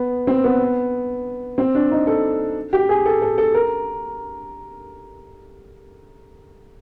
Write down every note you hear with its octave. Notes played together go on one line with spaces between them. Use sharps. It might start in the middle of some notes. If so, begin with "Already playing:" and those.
Already playing: B3
C4
B3
C4
D4
D#4
A4
G4
G#4
A4
A4
A4
A#4